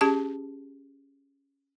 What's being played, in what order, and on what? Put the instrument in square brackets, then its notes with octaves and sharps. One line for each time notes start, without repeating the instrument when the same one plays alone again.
[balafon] C#4 G4 G#4 A5